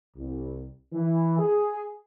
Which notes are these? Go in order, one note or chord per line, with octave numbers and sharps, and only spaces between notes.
C2
E3
G#4